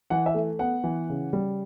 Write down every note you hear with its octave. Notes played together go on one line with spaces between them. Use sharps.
E3 F#5
E5
A3
B3 F#5
E3
C#3
G3